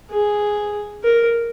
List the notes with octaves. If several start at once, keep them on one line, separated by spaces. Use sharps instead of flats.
G#4
A#4